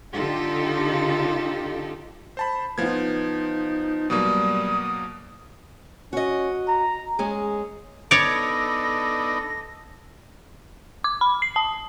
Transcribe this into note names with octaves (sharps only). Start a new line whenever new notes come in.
D3 D#4 F4 G4 A4
C5 A5 B5
F3 B3 D#4 F4 G#6
B2 F#3 G3 A#3 D#6
C#4 F#4 D#5
A#5
G#3 C#4 G#4
B3 D4 D#4 A4 C#5 D5 A#6
D6
B5
C7
A5